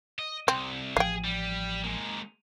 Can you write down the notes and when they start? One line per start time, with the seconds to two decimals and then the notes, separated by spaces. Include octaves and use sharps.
0.19 D#5
0.48 C2 C4
0.97 A1 F3 G#4 F5 G5
1.25 G3
1.85 G#3 A#3